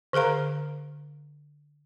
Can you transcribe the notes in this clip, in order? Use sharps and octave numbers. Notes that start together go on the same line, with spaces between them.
D3 G#4 A#4 F5 A#5